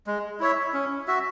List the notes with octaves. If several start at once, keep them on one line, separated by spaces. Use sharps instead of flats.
G#3
E4 C#5 E5
C#4
F#4 E5